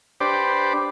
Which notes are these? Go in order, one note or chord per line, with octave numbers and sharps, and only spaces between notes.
D4 G4 B4 C5 D5